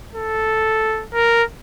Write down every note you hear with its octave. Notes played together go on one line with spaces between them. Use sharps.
A4
A#4